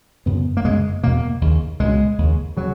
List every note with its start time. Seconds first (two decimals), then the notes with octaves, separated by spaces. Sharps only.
0.26 F#2 C#3 B3
0.57 A#3
0.65 F#2 C#3 G#3
1.03 E2 B2 A#3
1.41 D#2 C#3
1.80 C#2 B2 G#3
2.18 D#2 C#3
2.57 C#3 F#3